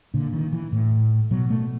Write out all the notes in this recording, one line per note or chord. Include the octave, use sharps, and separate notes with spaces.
A#2 D3
D#3
E3
A2
B2 F#3
A3